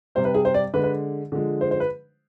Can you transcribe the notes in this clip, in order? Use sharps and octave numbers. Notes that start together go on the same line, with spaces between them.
C3 G3 C5
B4
G#4
C5
D5
D3 G#3 B4
B4
D3 F3 G#3
C5
C5
B4